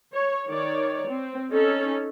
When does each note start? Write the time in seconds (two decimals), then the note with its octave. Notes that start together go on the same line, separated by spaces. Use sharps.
0.12 C#5
0.48 D#3 C#5 D5
1.09 C4
1.51 C#4 D#4 A4